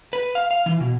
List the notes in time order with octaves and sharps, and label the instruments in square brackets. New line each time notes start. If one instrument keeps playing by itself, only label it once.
[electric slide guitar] B4
F5
F5
E3
B2